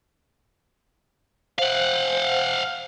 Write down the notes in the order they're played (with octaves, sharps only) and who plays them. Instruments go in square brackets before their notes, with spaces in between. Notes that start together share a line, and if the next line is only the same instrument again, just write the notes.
[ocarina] C5 [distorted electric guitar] F5 F#5